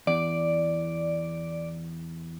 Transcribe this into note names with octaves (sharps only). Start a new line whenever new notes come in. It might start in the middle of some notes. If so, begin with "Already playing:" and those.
E2 D5